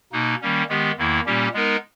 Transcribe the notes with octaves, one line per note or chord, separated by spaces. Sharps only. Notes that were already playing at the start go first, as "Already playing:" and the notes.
B2 A#3 D#4
D#3 G3 A#3 C#4
D#3 G#3 B3 G4
E2 D#3 A#3 E4
A#2 G3 A#3 C#4 G4
G#3 B3 D#4 A#4